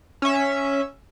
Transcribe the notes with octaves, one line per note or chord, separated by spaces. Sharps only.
C#4 E5